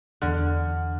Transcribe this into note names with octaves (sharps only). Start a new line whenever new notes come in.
E2 D3 F6 F#6